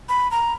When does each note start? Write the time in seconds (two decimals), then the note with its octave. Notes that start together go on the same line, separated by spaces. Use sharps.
0.09 B5
0.31 A#5